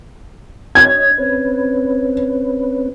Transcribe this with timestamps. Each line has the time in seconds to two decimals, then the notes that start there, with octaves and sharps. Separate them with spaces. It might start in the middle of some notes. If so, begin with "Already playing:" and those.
0.75 D4 C#5 D#5 G#6
1.18 C4 C#4 B4